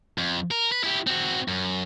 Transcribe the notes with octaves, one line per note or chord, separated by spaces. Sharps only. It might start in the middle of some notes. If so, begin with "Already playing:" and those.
F2
A#4
B4
E4 G4
C4 F#4
F#2